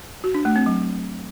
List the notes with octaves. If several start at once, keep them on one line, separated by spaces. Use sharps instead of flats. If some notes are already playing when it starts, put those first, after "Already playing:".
F#4
D4
A3
C4
F#3